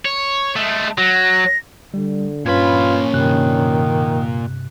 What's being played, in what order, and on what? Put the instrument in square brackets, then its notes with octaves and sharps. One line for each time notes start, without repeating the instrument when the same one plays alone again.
[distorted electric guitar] C#5
G#3 A3
[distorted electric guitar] F#3 [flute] A#6
[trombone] D3 [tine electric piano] G3
[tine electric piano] G2 B4 G#6 [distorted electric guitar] A#2 B5 [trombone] C#4 [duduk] F4
[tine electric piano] G2 C3 F#6 [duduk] D#3